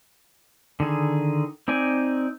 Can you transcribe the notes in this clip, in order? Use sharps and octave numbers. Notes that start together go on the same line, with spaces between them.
D3 D#3 G#4
C4 D#4 D5 G#5